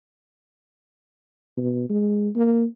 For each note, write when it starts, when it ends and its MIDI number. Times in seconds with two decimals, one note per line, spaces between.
1.57 1.89 47
1.90 2.29 56
2.36 2.65 58